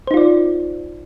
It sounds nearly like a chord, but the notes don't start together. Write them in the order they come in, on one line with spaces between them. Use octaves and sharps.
C5 D#4 F4 D5